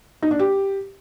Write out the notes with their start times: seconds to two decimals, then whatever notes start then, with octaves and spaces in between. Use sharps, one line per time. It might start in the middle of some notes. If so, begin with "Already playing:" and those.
0.22 D#4
0.31 D4
0.39 G4